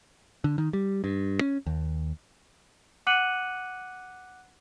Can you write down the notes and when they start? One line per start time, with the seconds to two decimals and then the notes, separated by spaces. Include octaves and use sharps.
0.44 D3
0.58 D#3
0.73 G3
1.04 G2
1.41 C#4
1.66 D#2
3.07 F#5 D6 F#6 C#7 D#7 F#7